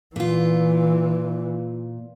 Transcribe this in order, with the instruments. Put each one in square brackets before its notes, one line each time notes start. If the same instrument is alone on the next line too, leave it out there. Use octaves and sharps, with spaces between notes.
[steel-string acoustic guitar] A#2 F4 [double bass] E3